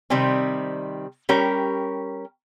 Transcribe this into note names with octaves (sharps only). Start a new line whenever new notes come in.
C3 D#3 G3 C4
G3 C#4 G4 A#4